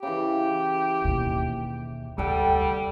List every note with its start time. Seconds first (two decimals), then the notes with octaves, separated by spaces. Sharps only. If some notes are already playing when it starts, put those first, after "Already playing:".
0.03 C#3 E3 G4
1.05 D#2 B2
2.18 F1 D2 G3 A4 F#5 G5